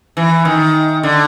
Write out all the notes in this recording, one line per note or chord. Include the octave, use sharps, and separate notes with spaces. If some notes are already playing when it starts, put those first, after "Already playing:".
E3
D#3
D3